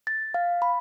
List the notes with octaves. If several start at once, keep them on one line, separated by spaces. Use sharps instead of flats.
A6
F5
B5